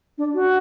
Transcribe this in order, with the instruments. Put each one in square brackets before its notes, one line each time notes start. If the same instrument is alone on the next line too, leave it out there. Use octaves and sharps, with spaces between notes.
[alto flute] D4
F#4